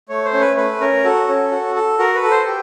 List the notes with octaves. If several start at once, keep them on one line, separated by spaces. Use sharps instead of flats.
A3 C#5
C5
C#4
B4
A3 B4
C#4 A#4
F#4 A4
C#4
F#4
A4
F#4 A#4
B4
A4
C5
G4